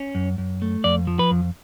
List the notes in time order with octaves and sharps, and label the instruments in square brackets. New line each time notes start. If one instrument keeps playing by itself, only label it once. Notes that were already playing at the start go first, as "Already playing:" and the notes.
Already playing: [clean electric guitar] C#4
F#2
F#2
A3
F2 D5
F3
B4
F2